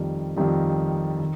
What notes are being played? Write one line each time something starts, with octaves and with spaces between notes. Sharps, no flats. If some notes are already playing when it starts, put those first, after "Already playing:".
Already playing: F2 D#3 G3
F2 D#3 G3
D#3